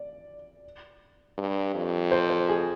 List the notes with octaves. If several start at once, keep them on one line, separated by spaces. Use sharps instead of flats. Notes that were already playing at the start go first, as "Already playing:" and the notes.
Already playing: D5
G2
F2
C5
C5
G#4